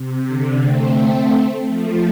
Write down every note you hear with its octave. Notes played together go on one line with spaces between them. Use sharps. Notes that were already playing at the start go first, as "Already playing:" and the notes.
Already playing: C3
D3
A3 C4
F3 A3